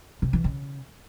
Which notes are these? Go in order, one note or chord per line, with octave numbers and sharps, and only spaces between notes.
C3
E3
C#3